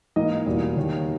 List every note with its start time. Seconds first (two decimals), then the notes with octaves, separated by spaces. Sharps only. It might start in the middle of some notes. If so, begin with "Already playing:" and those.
0.16 G#2 E3 A#3 D#5
0.46 E2 B2 G3 A#3
0.77 D#2 D#3 A#3